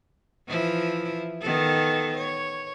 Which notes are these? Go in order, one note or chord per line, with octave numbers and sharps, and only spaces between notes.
E3 F3 E4
D#3 B3 A4
C#5